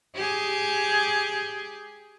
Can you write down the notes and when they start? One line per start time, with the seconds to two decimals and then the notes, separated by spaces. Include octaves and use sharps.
0.16 G4 G#4